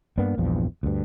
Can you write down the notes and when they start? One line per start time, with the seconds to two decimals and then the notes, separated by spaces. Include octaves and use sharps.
0.18 G2 A#3 B3 D4
0.38 A#1 E2 G2 F3
0.83 D2 G2